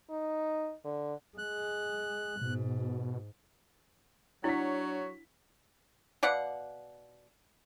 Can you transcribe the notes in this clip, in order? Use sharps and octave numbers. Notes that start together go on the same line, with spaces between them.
D#4
D3
G#3 F#6
G#2 B2
F#3 D4 E4 F#4 C#5 F#5 B6
B2 D5 F5 F#5